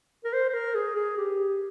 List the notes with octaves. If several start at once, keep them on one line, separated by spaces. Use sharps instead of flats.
A#4
C5
C5
A#4
G#4
G#4
G4